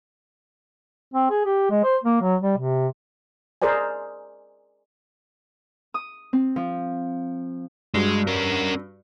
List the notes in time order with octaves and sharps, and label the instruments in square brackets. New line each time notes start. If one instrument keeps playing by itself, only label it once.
[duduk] C4
G#4
G4
G#3
C5
A#3
F#3
G3
C3
[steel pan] G#4 A#4 C5 D5 G#5
[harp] D#6
C4
F3
[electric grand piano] G2 F#4 [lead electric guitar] G#3
[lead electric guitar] C#4 A#4